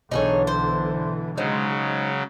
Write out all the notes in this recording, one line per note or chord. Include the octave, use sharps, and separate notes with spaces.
B1 D3 E3 D#4 G#4 C#5
C5
C#3 F#3 G#3 D#4 C5